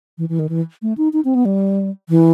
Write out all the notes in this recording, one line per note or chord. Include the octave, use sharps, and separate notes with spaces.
E3
E3
D#3
E3
A3
D#4
D#4
C4
B3
G3
E3